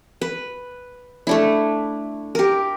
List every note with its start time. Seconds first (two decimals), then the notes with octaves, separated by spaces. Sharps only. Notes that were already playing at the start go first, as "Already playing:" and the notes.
0.22 B4
1.27 A3 D4 E4
2.35 G4 A#4